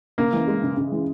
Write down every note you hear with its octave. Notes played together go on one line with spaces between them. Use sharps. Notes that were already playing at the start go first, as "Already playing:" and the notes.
C#3 A#3
E3
G#3
C#3
C#3
E3